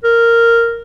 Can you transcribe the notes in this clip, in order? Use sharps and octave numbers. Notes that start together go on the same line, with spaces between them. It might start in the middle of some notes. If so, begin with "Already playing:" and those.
A#4